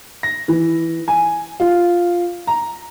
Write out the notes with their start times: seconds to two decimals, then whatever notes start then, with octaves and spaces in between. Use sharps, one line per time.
0.23 A#6
0.48 E3
1.08 G#5
1.60 F4
2.47 A#5